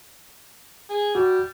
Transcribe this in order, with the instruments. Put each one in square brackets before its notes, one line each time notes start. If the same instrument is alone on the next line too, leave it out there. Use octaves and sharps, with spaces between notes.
[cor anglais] G#4
[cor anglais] G3 [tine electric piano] F#4